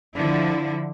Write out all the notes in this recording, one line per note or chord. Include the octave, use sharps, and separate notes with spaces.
D3 F3 E4